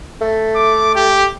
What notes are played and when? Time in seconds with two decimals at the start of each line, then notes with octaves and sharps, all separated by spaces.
0.22 A3
0.55 D6
0.95 G4